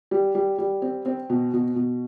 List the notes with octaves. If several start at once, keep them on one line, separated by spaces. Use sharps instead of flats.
G3
G3
G3
C4
C4
B2
B2
B2